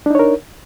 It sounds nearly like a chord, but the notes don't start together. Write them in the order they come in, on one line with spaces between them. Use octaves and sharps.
D4 D#4 C#5 A#4